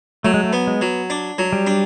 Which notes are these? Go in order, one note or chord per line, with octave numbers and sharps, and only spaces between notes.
F#3 A3
G#3
A3
B3
G#3
F#3
D4
F#3
G3
D4